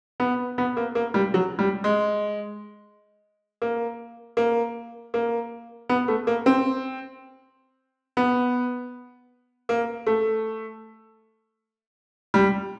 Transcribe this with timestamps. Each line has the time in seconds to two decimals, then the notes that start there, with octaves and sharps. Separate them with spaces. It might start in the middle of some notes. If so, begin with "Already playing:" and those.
0.20 B3
0.58 B3
0.77 A#3
0.95 A#3
1.14 G3
1.34 F#3
1.59 G3
1.84 G#3
3.62 A#3
4.37 A#3
5.14 A#3
5.89 B3
6.08 A3
6.27 A#3
6.46 C4
8.17 B3
9.69 A#3
10.07 A3
12.34 G3